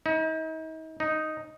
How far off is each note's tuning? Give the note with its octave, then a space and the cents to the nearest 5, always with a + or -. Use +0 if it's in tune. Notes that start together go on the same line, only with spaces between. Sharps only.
D#4 +40
D#4 +0